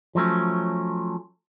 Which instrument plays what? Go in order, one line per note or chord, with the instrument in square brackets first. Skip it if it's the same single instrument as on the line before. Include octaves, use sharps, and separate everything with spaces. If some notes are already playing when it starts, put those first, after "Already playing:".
[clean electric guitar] F3 F#3 A3 C#4